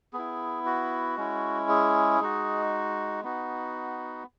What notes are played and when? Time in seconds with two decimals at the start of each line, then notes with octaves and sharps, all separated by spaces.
0.13 B3 G#4
0.18 E4
0.66 F#4
1.17 G#3 C#4 E4
1.69 G#4
2.20 G#3 D#4 F#4
3.23 B3 D#4 F#4